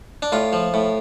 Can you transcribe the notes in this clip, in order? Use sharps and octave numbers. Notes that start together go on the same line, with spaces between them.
D4
A2 F4
F3
A2